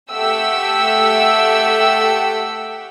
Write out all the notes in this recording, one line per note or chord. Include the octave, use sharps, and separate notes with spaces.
A3 G4 E5 F#5 G5 E6